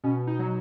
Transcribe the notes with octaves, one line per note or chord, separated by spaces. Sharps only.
B2 C#4
D#4
F#3